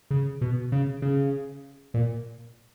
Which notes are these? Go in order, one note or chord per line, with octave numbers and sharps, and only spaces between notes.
C#3
B2
C#3
C#3
A#2